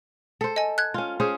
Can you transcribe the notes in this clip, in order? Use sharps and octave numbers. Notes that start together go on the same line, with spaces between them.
A4 C5
D#5 G#5
F#6 G#6
C#4 F4
C#4 G#4 C5